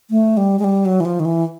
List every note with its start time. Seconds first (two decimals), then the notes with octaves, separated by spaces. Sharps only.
0.10 A3
0.37 G3
0.59 G#3
0.64 G3
0.85 F#3
1.00 E3
1.05 F3
1.20 D#3
1.25 E3